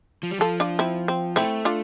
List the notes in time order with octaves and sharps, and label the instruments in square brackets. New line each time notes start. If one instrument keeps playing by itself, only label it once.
[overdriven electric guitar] F3
G3
[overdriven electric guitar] F3 [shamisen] F4 A4
[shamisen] D4 F4
C4 E4
C4
[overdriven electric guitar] A3 [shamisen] C4 E4
[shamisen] D4 F4